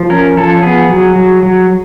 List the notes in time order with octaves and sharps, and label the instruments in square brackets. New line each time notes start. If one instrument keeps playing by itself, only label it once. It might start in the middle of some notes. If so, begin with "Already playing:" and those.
Already playing: [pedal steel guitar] F3
C#4 A#4
F3 A4
B3 G#4
F#3
F#3
F#3